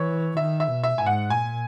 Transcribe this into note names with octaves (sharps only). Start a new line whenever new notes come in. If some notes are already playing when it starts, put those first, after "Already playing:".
Already playing: E3 C#5
D#3 E5
E5
B2
E5
G#2 G#5
F#5
A#2 G#5